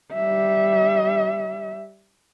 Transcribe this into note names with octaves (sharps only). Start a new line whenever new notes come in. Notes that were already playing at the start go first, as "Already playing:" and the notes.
G3 E5